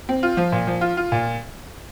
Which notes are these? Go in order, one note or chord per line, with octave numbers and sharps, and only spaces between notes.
C4
F4
F3
A#2
F3
F4
F4
A#2